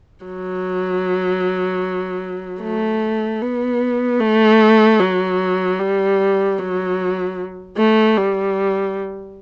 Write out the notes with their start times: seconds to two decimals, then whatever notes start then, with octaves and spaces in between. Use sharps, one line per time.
0.25 F#3
2.62 A3
3.41 B3
4.20 A3
5.00 F#3
5.79 G3
6.59 F#3
7.77 A3
8.17 G3